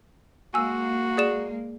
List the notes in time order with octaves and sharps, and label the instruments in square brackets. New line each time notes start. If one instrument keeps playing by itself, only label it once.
[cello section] G#3 A#3 [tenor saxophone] F#4 [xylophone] G#5 E6
[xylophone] G#4 D5 E7